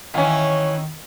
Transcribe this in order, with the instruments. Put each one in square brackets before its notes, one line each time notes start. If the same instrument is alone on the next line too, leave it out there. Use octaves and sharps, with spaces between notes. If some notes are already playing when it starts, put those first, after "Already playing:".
[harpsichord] D#3 [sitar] E3 C#4 [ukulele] F5 G#5